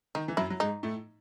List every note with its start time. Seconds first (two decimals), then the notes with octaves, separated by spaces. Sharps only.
0.15 D#3 D#4
0.28 E3
0.37 F#2 F#3 E4
0.50 F#3
0.60 G#2 G#3 D#4
0.83 A2 A3